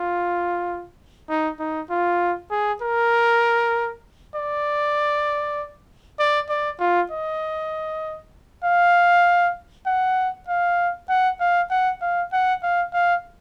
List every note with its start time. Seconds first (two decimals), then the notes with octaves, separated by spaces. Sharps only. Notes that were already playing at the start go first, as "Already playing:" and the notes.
Already playing: F4
1.29 D#4
1.60 D#4
1.90 F4
2.51 G#4
2.82 A#4
4.36 D5
6.19 D5
6.49 D5
6.80 F4
7.12 D#5
8.64 F5
9.87 F#5
10.48 F5
11.10 F#5
11.41 F5
11.71 F#5
12.02 F5
12.33 F#5
12.63 F5
12.94 F5